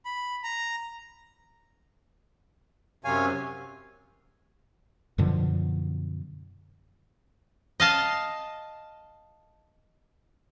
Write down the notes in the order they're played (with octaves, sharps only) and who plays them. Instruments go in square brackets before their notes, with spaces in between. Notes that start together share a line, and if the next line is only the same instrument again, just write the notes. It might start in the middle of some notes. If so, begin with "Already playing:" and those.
[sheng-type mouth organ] B5
A#5
[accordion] F#2 C3 [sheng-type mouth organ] C#5 F5 G#5
[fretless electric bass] F#2 B2 D3 F3
[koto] D#5 F5 A5